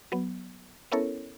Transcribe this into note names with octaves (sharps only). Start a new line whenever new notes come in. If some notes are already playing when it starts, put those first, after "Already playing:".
F#3 B3
B3 C#4 E4 A4 A#4 C#5